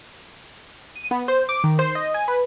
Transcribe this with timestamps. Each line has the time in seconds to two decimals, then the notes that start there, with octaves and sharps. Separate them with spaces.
0.96 D#7
1.11 B3
1.28 C5
1.49 D6
1.64 D#3
1.79 C5
1.95 D#5
2.14 G#5
2.28 B4